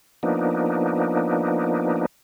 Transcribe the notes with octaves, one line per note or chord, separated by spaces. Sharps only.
F3 A#3 B3 D4 D#4